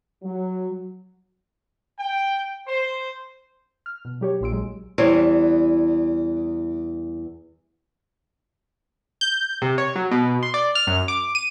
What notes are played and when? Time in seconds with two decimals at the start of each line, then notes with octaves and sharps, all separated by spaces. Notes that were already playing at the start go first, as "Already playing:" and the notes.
0.23 F#3
1.99 G5
2.67 C5
3.86 F6
4.05 B2
4.21 F#3 G4 C#5
4.41 A#1 A#2 C6 E6 D7
4.52 C2 F#3 G#3
4.98 E2 E3 G3 C5 C#5
9.21 G6
9.62 C3
9.78 C#5
9.96 F#3
10.11 B2
10.43 C6
10.54 D5
10.75 F6
10.87 F#2
11.08 D6
11.35 D#7